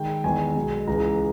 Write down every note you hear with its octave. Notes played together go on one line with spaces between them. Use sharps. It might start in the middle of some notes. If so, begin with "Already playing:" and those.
Already playing: D#3 G#3 G5
E2 D#3 G#3 G#5
B1 B2 G#3
C#2 C#3 E3 G#3 A#5
A#5